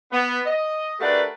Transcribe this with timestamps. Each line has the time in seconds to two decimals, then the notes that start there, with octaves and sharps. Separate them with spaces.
0.12 B3
0.46 D#5
1.00 A3 D4 F#4 G4 A#4 B4